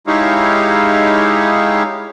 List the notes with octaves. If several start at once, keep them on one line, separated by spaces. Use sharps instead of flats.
G#3 D#4 E4 G4 C#5 F5